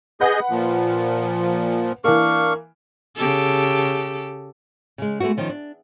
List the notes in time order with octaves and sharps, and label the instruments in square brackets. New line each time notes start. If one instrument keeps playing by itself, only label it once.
[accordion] G#4 D#5 G6 [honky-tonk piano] B4 F#5
[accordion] A#2 F3
[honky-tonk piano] E3 A#3 [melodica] D4 F5 C#6
[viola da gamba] C#3 G4 A4
[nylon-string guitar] C#3 G#3
G#3 A3 B3 C4 F#4
D#3 F3 C#4
D4